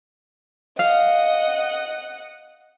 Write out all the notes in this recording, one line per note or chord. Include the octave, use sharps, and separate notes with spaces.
D#5 F5 F#5